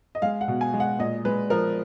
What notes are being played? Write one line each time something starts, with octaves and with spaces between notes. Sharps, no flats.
D#5
G#3 F5
F#5
B2
G#5
G#3
F#5
A#2 D#5
G#3 B4
F3 A#4